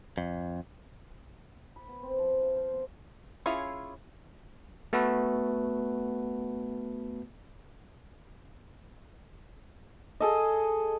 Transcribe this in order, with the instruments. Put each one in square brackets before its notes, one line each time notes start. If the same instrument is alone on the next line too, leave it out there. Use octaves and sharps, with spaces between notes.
[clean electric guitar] F2
[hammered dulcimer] B5
B3
C4
F3
F4
C5
B3
[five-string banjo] C#4 E4 F4 G#4 C#5
[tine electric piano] A3 B3 F#4 A4 B4
[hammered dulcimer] G#4 A4 D#5